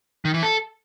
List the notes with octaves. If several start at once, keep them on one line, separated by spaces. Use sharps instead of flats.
D#3
E3
A4